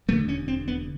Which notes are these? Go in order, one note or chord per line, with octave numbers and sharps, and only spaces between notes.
E1 D#2 D3 A3
C#4
C4
B3